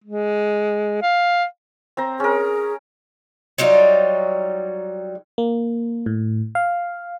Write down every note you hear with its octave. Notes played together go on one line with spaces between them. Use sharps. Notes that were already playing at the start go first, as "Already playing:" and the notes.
G#3
F5
C4 C5 A#5
C#4 G#4 A#4
F#3 G3 D#4 F4
A#3
A2
F5